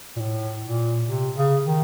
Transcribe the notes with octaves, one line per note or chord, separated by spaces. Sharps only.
A#2
A2
A#2
C3
C#3
D#3